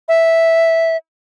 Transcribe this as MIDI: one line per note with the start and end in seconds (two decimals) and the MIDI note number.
0.09 0.97 76